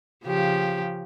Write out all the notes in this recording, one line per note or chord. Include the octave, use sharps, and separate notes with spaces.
C#3 F3 G4